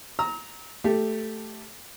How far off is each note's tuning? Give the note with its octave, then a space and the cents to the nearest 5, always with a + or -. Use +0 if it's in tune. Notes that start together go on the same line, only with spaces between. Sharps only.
A#5 +0 E6 -40
A3 +0 G4 +0